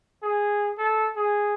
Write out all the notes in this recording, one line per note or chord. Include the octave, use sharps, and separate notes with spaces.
G#4
A4
G#4